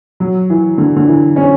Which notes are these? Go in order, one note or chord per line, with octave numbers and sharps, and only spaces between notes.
F#3
E3
D3
D3
E3
C#4